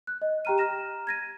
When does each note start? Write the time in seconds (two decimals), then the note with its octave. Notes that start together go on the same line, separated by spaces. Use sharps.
0.07 F#6
0.22 D#5
0.45 G4 G5 A#5 F6 D#7
0.58 A#5 F6 A#6 E7
1.07 G#6 A#6 D#7